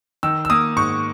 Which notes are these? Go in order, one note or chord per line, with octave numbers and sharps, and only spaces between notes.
D#3 E6
E6
A#3 D#6
G#2 C#6